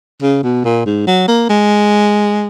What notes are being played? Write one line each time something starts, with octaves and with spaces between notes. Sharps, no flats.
C#3
B2
A#2
G#2
F#3
A#3
G#3